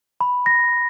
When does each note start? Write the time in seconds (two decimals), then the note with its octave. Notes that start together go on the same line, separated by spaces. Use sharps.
0.21 B5
0.46 A#6